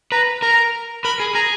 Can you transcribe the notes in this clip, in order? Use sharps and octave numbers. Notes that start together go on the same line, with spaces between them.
B4 A#5
A#4 A#5
A#4 B5
G#4
G#4 A#5